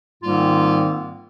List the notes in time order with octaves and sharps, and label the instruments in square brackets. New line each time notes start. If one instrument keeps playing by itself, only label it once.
[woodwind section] G#2 D#3 G3 A#3 C4 F4